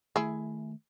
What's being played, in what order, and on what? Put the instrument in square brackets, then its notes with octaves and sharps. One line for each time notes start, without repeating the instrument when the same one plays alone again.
[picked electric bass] D#3 A3 [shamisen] E4 G#4